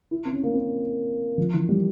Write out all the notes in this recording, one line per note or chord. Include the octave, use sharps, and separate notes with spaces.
E4
C4
C#4
A#3
C4
F3
E3
G3